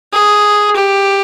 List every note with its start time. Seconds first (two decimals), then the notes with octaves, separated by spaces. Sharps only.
0.13 G#4
0.76 G4